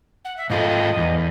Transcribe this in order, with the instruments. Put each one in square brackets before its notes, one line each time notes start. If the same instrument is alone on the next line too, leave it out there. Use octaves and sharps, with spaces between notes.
[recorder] F#5
E5
[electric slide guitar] G#2 F4 A4 [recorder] D#5
[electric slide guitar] E2